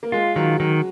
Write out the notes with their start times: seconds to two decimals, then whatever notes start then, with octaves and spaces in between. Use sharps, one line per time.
0.03 A#3
0.12 G#3 F4
0.36 D#3 F#3
0.60 D#3 F#3